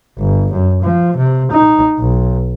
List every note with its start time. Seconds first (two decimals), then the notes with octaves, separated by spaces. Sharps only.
0.17 G1
0.53 F#2
0.83 F3
1.17 C3
1.52 D#4
1.99 B1